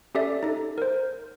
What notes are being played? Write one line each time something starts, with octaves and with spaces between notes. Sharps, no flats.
C#4 G4 A4 D5 E5
D#4 A4
A#4 C5